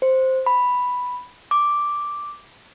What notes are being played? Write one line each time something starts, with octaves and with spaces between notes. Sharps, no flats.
C5
B5
D6